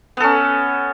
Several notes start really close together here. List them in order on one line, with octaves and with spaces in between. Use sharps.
B3 A4 C#4